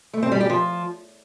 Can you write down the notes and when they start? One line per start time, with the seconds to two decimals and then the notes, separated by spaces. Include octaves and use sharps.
0.13 A3
0.23 C4
0.32 G3
0.41 G4
0.50 F3